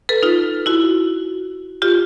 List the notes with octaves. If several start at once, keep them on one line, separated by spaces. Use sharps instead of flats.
A4 B4
D#4 F4
E4 F#4
F4 G4